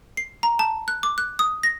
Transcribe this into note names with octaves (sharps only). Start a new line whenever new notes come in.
C7
A#5
A5
F#6
D6
F#6
D#6
A#6